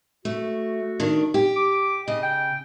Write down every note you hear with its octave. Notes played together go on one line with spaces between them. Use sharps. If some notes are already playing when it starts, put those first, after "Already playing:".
A3 F#4
D#3 D4
G4
D6
C#3 D#5
G5